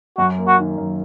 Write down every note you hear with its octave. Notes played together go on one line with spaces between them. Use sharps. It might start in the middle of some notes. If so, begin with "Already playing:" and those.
F#2 F#4
A#3
F#4
D#3
F#2